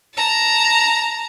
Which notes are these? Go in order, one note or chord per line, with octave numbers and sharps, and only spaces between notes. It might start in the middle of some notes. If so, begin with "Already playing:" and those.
A5 A#5